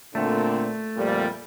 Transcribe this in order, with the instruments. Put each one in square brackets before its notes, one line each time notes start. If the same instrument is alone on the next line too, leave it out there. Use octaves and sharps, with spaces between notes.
[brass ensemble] A#2 D3 C4 [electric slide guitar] A3
[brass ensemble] F2 A#2 G3